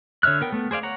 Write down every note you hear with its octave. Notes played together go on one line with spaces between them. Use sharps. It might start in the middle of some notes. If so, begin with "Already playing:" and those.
D3 C#5 E5 F6 F#6
B3 A#4 G5
A3 B3
G#4 C5 D5 F5
C#5 F#5 A#5